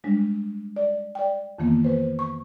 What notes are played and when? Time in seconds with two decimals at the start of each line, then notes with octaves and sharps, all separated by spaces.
0.04 G3 G#3 D4
0.76 D5
1.15 D5 G5
1.58 F2 D#3 E3 A#3 B3
1.84 B4 C5
2.19 C#6